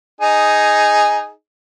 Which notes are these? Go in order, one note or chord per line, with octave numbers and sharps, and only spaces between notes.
D#4 G#4